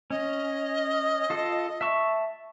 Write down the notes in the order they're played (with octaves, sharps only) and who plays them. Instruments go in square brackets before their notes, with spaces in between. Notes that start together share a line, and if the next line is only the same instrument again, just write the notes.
[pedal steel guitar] C#4 [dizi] D#5
[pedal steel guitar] F4 A4
E5 A5 C#6